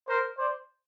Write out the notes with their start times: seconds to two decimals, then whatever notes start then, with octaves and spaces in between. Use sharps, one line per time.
0.08 A#4 C5
0.38 C5 D5